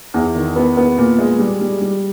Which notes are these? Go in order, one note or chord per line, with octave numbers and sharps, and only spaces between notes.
E2
D#3
B3
B3
A#2
G#3
G3
G3
G3